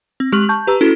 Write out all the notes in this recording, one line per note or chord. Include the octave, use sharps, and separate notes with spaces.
C4
G#3 G4 C#6 F6 F#7
A5 C#6 G6
G4 B4 A#5 E6
C#4 E4 F#4 A4